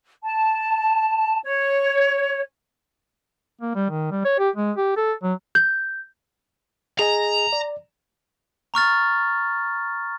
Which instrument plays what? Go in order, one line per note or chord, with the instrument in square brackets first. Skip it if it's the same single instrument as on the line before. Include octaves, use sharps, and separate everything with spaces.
[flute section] A5
C#5
[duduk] A#3
G3
D#3
G3
C#5
G4
G#3
G4
A4
F#3
[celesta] G6
[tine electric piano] G#4 D#5 G#5 [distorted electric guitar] A#5
[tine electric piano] D5
[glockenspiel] A#5 C#6 F6 A6